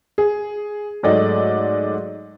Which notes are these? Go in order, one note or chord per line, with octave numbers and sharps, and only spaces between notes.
G#4
G#2 F#3 A3 D5 D#5